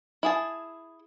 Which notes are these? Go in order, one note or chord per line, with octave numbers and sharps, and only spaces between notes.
E4 G#4 A5